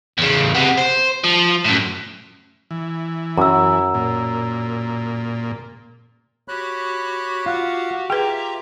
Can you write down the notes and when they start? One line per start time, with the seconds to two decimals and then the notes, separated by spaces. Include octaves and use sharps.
0.18 E2 C#3
0.55 C3 B3
0.78 C5
1.24 F3
1.65 F#2 A2
2.71 E3
3.37 F#2 A#5 E6
3.94 A#2
6.48 F#4 G4 C#5 B5 F#6
7.46 F4 F5 F#5
8.10 F4 G4 G#4 B4 E5 G5 A#5